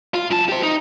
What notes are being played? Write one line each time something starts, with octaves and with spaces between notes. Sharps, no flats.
F4
F#2 A5
G4 C5
D#4